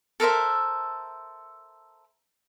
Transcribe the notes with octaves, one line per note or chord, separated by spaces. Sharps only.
A4 A#4 C5 E5